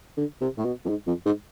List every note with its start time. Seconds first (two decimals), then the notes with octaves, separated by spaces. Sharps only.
0.17 D3
0.41 C3
0.57 A2
0.65 B2
0.85 F2
0.89 G#2
1.07 F2
1.25 G#2